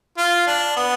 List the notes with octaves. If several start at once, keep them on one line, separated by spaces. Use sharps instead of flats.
F4
D4
B3